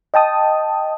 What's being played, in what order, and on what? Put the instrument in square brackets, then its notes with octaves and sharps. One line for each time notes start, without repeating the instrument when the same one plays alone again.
[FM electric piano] D#5 G5 A5 D#6